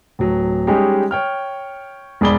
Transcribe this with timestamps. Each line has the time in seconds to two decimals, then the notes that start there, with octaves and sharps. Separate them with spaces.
0.19 D1 F#3
0.67 G3 G#3 C#4 D#4 G4
1.11 C#5 G5 F6
2.21 E1 G#2 G#4 D5 B5 G7